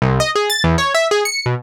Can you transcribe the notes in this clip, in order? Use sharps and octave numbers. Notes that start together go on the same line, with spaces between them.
C2
D#5
G#4
A6
E2
C#5
E5
G#4
C#7
B2